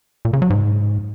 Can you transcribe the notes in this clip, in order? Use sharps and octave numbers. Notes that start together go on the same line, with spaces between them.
A#2
C#3
F#3
G#2